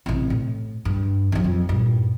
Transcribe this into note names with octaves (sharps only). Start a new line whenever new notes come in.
A1 C3
A2
G2
D#2 F#3
F2
G2 A#2